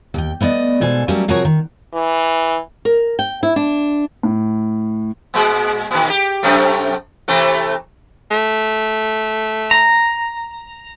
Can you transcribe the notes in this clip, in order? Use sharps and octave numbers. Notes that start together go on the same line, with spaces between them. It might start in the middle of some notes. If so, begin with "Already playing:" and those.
D#2 G5
A3 B3 D5 D#5
G#2 B2 A4 C5 G#5
F#3 G3 A3 A#3 C#4 G4
C3 F3 F#4 G#4 A#4 C#5
D#3
E3
A#4
G5
E4
D4
A2
A#2 G#3
A#2 D#3
G4
F#2 C3 A3
C3 E3 A3
A3
A#5